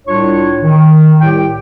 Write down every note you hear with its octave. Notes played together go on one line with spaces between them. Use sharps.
C2 A2 D4 F4 C#5 C#6
D#3
C2 A2 G4 G5